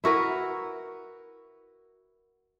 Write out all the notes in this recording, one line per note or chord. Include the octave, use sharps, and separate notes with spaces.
E4 F#4 A#4 B4